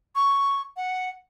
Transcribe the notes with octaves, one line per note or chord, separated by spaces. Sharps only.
C#6
F#5